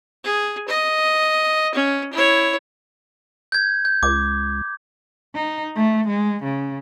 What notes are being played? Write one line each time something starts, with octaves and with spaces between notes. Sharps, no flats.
G#4
D#5
C#4
E4 C#5
G6 G#6
G6
C#2 D6
D#4
A3
G#3
C#3